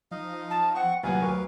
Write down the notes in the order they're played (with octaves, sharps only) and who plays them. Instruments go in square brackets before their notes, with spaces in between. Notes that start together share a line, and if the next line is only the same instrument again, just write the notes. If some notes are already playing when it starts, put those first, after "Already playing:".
[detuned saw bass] F3 [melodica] D#4 D#5 F5
[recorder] A5
[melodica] C4 C#6 [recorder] F#5
[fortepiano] C2 A#2 F#5 [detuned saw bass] F#3 [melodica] B4 F5 [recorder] G#5
[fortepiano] D2 A#4 C#6